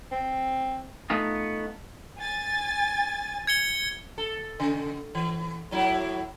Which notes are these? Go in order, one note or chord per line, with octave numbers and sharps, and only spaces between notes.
C4
A3 B3 D#4 F4
G#5 A6
G#6 C#7 G7
A4
C#3
E3
A2 F#3 E4